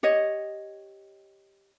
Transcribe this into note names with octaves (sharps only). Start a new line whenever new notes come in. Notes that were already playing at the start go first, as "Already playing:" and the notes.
G4 C#5 D#5